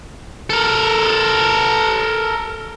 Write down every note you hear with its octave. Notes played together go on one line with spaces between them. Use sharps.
A4 A#4